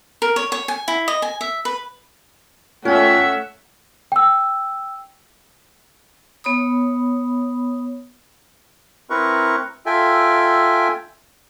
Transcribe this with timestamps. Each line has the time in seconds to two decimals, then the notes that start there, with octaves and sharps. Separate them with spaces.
0.22 A#4
0.36 C#5
0.52 C#5
0.68 G#5
0.88 E4
1.08 D#5
1.22 G#5
1.41 E5
1.65 B4
2.85 A3 C#4 F4 E5 F#5 G5
4.12 G5 E6
6.44 B3 C#5 B5 D#6
9.10 C4 E4 A#4 B4 A#5 C#6
9.86 F4 A4 E5 G5 G#5